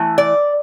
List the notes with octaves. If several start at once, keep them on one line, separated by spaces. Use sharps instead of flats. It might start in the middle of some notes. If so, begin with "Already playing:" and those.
Already playing: E3 A3
D5